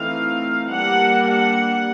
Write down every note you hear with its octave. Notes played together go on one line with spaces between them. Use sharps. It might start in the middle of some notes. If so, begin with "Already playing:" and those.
Already playing: E3 A3 C4 D#4 F5
G3 A#3 D4 F#5
F#5